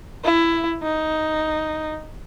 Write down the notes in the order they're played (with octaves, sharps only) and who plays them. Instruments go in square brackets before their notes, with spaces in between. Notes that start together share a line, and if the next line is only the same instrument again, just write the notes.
[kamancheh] E4
D#4